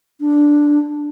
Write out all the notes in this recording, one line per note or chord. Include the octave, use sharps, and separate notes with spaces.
D4